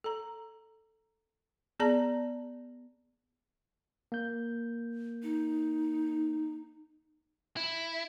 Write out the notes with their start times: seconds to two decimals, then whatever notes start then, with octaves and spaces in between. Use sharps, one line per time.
0.04 A4 A#5
1.80 B3 G#4 D5 A5 A#5
4.12 A#3 G6
5.23 D#4
7.57 E4